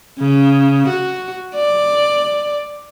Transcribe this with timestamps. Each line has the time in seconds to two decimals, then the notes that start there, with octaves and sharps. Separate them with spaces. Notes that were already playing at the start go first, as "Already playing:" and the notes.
0.19 C#3
0.88 F#4
1.55 D5